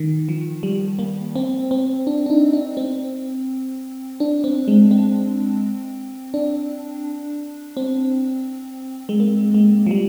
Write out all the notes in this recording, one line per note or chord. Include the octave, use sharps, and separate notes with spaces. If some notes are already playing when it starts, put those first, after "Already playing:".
Already playing: D#3
F3
G3
A#3
C4
C4
D4
D4
D#4
D4
C4
D4
C4
G#3
C4
D4
C4
G#3
A#3
G#3
F3
G3